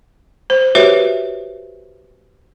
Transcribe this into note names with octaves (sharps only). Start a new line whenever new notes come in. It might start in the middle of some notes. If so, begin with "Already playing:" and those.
C5
F#4 G4 B4 C#5 E5